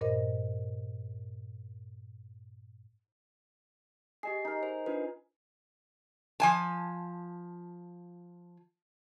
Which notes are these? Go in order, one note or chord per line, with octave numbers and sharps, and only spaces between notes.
G2 A#2 A#4 C5 D#5
G4 G#4 D#5 C7
D#4 A#4
C5
D4 F4 B4
F3 G#5 A5